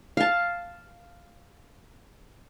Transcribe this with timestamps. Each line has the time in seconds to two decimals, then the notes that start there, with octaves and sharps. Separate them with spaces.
0.17 F5 A5